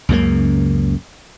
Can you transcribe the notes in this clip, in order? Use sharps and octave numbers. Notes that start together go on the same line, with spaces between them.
C#2 F#2 C#3 A#3